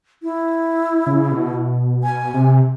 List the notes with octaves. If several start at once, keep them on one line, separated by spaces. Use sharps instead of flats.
E4
C#3
B2
G#5
C3